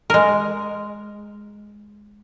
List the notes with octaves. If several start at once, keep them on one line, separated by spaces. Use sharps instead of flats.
G#3 A#4